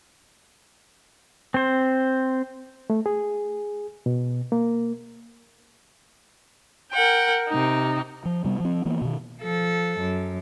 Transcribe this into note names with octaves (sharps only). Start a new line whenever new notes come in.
C4 C5
A3
G#4
B2
A#3
A#4 F#5 G5
C3 D#4
F3
C3 G3 B3
F3 C4
E3 A#3 B3
B2 D#3
F3 A4
F#2